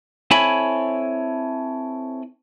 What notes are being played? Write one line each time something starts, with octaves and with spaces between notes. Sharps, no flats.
C4 E4 A4 C#5 G#5 B5